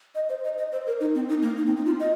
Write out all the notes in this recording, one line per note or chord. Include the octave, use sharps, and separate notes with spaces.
D#5
C5
D#5
D#5
C5
A#4
D#4
C4
D#4
A#3
D#4
C4
D#4
F4
D#5